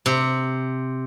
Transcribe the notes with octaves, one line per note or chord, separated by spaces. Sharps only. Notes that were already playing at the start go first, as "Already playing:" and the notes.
C3